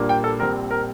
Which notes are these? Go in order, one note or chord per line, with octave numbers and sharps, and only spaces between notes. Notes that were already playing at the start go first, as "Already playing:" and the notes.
Already playing: A#1 A#2 G3 A#3 D4
G5
A4
A#1 A#2 G3 C4 A#4
A#4